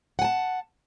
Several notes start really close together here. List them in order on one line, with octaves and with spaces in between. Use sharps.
F#5 G#5 A5